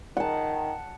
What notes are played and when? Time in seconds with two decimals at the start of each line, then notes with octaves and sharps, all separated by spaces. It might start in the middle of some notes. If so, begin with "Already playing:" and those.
0.17 D#3 F#5 A5